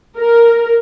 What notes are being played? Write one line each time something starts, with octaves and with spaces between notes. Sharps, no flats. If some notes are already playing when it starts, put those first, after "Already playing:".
A#4